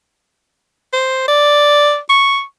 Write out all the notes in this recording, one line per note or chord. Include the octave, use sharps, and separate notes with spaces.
C5
D5
C#6